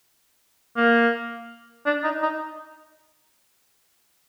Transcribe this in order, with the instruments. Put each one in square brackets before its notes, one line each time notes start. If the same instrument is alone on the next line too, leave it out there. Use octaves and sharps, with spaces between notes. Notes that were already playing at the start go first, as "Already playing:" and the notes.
[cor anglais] A#3
D4
D#4
D#4